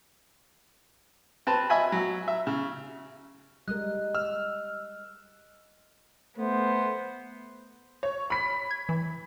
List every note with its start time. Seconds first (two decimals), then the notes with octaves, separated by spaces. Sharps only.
1.47 C4 B4 A5
1.70 D#5 E5 G#5 B5
1.92 F#3
2.28 E5
2.47 C#3
3.68 G3 G#3 A#4 D#5 F#6
4.15 E6 F6
6.38 A3 B3 C5
8.03 C#5
8.30 B5 B6
8.71 G#6
8.89 E3